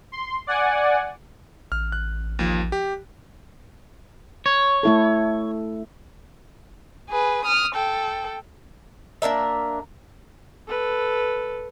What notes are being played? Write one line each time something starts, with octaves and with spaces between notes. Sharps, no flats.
C6
D5 F#5 G#5
A1 F6
F#6
D#2 F3
G4
C#5
A3 E4 A4
G#4 B4
D#6 F6
A4 G5
A#3 D4 A#4 E5
A4 B4